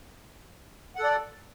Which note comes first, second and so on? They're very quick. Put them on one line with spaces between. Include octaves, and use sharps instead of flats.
F#5 A4 D5